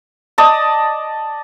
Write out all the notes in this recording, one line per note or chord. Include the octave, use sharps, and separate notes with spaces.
D5 D#5 A5 D#6